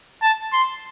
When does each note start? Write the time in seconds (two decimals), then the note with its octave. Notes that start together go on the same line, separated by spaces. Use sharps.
0.22 A5
0.53 C6